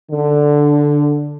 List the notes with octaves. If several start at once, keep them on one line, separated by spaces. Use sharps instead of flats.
D3